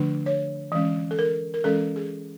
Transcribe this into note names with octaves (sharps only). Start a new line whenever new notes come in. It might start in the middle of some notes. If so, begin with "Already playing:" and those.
Already playing: D3 F3 A3 D4
C#5
E3 G#3 C#4
A4
A#4
A#4
E3 G#3 C#4 A4
G#4